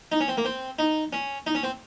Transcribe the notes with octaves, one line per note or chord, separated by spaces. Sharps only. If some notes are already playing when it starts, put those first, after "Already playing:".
D#4
C#4
C4
A#3
C4
D#4
C#4
D#4
C#4
C4